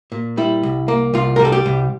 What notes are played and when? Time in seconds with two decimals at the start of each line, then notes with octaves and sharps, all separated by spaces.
0.12 A#2
0.37 G3 E4
0.63 C2
0.88 A#3
1.14 C2 F4
1.36 A#4
1.40 G3
1.45 A4
1.52 G4
1.66 C2